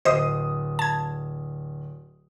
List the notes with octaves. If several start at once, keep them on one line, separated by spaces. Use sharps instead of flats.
D1 C5 D#5 D#6
A5 G#6